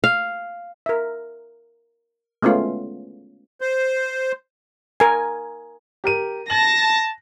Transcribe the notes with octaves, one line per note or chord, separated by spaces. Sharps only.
F5
A#4 E5
G#3 A3 B3 C#4 F4
C5
A#4 G#5
G4 A#4 D#7
A5 A#6 F#7